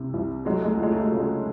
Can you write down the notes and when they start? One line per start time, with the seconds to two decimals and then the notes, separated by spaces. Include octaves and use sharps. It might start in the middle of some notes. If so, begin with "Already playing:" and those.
Already playing: C2 C3
0.14 C2
0.45 F#3 G#3
0.54 A3
0.64 G#3
0.74 C#2 A3
0.83 G#3
0.92 A3
1.02 G#3
1.10 C#3 A3
1.19 G#3